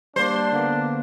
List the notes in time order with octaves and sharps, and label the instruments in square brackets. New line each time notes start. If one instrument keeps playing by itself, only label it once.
[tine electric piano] G3 A#3 [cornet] D4 [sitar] C5
[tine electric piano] D3 A#3 B3